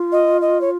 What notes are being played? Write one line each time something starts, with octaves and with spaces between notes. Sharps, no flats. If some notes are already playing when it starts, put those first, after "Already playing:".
Already playing: F4
D#5
D#5
C#5